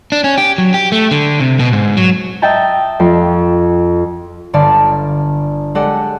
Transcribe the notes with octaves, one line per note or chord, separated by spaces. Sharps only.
D4
C#4
G4
F#3
G4
A3
D3
C3
B2
G#2
F#3
D#5 E5 G5 A5 A#5
F2
G1 D3 D5 F5 A5
G#3 G4 A4 D5 F#5